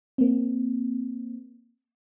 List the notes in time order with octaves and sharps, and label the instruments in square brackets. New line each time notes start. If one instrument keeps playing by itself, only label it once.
[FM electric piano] A#3 C4